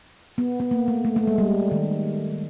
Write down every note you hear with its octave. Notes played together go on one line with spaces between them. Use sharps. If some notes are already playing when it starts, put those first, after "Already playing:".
B3
B3
A#3
A3
A3
A3
G#3
G3
D#3